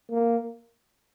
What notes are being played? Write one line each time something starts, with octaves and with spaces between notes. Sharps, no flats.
A#3